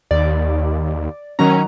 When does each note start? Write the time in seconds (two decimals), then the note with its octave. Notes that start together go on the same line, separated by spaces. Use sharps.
0.11 D#2 D5
1.39 D#3 F#3 C#4 A#5